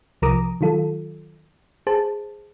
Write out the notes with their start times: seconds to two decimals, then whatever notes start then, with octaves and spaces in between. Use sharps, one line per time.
0.22 C2 F3 A#4 A#5 D6 D#6
0.61 D#3 F#3 F4 A4
1.87 G#4 C5 A5